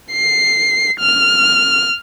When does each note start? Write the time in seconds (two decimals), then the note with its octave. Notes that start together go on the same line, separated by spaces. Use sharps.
0.12 C7
1.00 F6